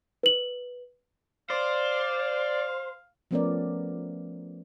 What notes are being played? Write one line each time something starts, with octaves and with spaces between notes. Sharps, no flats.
B4 F#7
C5 D5 F5
F3 A3 B3 C#4 A#4 D5